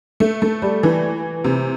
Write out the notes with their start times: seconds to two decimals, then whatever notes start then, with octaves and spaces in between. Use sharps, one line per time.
0.20 A3
0.42 A3
0.62 G3
0.83 E3
1.44 C3